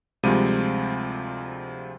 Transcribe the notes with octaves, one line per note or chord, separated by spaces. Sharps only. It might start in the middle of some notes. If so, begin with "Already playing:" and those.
D2 C3 F3 G3 G#3 D#7